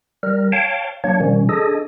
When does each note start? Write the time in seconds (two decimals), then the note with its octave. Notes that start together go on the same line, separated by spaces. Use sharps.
0.23 G3 A#4
0.52 C#5 F5 G5 A5
1.04 F#3 A#3 D4 C#5
1.20 B2 D#3 F3 G3 C#4
1.49 D4 G#4 A4 D#5